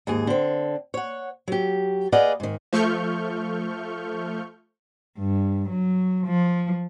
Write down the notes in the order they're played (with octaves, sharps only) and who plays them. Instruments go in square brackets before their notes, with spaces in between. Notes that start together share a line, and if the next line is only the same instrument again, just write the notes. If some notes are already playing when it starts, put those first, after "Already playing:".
[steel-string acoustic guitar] D#2 G#2 G#4
D3 C4
C#5 F#5
F#3 G4
G#4 B4 D5 D#5 F5 F#5
G#2 D#3
[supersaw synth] F3 A3 C#6 F6 G6
[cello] G2
F#3
F3